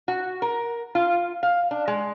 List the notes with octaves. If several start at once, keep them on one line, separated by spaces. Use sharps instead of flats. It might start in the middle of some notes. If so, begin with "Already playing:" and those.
F#4
A#4
F4
F5
D4
G#3